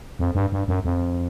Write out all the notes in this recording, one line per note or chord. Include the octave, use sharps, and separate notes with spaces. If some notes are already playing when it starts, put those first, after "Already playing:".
F2
G2
G2
F#2
F2